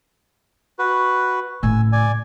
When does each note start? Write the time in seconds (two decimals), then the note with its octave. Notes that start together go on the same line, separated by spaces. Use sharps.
0.79 F#4 B4
1.63 A2 C#3 G#5 E6
1.92 D5 G#5